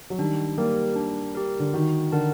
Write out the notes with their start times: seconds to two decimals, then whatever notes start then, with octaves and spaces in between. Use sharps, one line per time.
0.10 F#3
0.18 D#3 G3 D4
0.57 G3 A#3 G4 A#4
0.96 D4
1.35 G4 A#4
1.60 D3
1.74 D#3 F#4
2.12 D3 A#4 F#5 A5